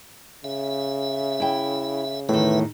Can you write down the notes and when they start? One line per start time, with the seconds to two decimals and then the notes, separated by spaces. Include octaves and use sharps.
0.44 C#3 E5
1.40 E4 G5
2.29 E2 A2 D#3 B4 E5